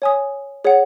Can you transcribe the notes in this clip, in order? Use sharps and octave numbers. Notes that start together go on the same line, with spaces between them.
C#5 G#5 D#6
G#4 C#5 F#5